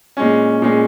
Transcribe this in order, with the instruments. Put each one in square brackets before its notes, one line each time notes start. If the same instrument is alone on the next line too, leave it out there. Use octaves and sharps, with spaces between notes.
[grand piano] A#2 G#3 C#4
A#2 G#3 C#4